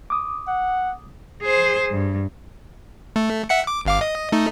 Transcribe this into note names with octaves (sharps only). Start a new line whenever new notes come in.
D6 D#6
F#5
G#4 C5
G2
A3
E5 F#5 C#7
D6
G1 F5 D6
D#5
A3 D#4